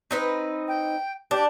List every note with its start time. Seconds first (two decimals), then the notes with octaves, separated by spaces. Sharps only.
0.11 C4 D#4 B4
0.68 G5
1.31 D4 G4